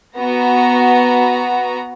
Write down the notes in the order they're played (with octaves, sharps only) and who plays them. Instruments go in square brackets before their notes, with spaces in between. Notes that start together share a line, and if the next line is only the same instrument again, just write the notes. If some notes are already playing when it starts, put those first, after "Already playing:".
[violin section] B3 F#4 A#5